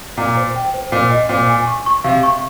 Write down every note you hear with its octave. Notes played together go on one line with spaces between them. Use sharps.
A#2 A#5
C5
G5
C5
A#2 C5
D#5
A#2 C5
G#5
C#6
C#6
C3 F5
C#6